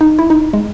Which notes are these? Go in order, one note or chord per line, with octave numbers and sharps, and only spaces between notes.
D#4
E4
D#4
G#3